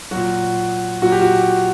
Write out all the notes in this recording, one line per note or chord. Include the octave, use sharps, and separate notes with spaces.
A#2 F#3 F#4
A#2 F#3 F#4
G4
F#4